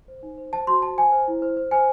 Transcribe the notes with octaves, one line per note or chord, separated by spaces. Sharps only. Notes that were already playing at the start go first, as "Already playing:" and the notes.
C5
D#4
C5
C5 A5
F#4 C6
C5 A5
C5 G#5
C5
E4
C5
C5
C5 G#5